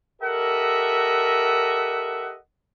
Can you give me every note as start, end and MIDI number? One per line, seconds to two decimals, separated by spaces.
0.22 2.37 67
0.22 2.37 69
0.22 2.37 70
0.22 2.37 75
0.22 2.37 76
0.22 2.37 78